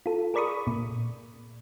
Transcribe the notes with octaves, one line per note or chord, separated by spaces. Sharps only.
F4 A4
G#4 A#4 D5 B5 C#6 D#6
A#2